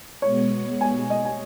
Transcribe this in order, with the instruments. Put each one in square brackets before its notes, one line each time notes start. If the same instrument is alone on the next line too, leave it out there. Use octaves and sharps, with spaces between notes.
[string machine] B2 G#3 B3 [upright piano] C#5
[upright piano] G#5
D#5
G#5